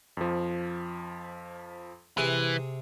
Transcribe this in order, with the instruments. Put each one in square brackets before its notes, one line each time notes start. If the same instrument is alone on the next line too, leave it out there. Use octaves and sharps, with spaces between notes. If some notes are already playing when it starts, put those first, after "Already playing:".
[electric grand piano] F2 F3
[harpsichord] C3 G#4 [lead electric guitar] E3